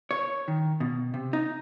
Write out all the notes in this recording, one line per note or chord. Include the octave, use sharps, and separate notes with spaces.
C#5
D#3
B2
C3
D#4